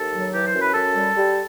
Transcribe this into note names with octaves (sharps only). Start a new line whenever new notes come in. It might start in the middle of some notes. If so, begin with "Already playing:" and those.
Already playing: D#2 A4
F#3
E3 G4
C5
F#2
B4
F#2 A4
G3
G3